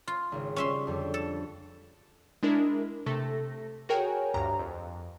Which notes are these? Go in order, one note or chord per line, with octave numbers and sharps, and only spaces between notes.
F4
G#1 C#3
G3 C#4 F4 E5 C6
F2 D3 G3
A4
G#3 D4 E4 A#4
C3 A3 A4 A#6
F#4 G#4 A#4 C#5 G5 G#5
D2 G2 G4 A#5
F2